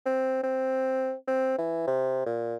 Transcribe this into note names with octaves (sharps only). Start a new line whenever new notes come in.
C4
C4
C4
E3
C3
A#2